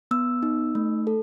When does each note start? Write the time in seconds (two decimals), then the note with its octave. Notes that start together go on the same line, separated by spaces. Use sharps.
0.11 B3 E6
0.43 D#4
0.75 A3
1.07 A4